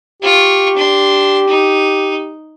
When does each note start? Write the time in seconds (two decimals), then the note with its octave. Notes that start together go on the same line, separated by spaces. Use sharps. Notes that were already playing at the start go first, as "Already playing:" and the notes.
0.22 F4 G4 C#6
0.76 D4 C6
1.47 D#4